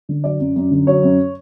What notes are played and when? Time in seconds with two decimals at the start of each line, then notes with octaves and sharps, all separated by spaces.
0.09 D3
0.24 F#3 D5
0.40 F#2
0.56 F#2
0.71 D3
0.87 F#3 C#5
1.03 F#2